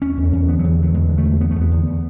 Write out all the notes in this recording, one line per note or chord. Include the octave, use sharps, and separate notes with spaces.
E2 C#4
E2
C#4
E2
D3 B3
F#3
E2
E3
D3 F#3
E2 G#3
D3
A3
E2
D3 B3
A3
E2
B3
E2